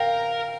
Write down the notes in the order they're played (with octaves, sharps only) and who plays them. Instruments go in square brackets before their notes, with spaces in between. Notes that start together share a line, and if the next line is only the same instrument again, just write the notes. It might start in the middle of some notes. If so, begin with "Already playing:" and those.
Already playing: [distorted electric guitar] A#4 [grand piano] F5 G5